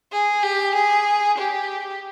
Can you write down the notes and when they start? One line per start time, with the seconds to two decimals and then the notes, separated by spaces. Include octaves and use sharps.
0.12 G#4
0.42 G4
0.74 G#4
1.37 G4